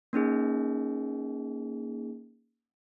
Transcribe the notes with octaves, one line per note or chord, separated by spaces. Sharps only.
A#3 C#4 D#4 G#4